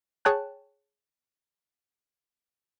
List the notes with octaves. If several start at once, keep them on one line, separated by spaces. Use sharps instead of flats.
G#4 C#5 G5 A5 F#6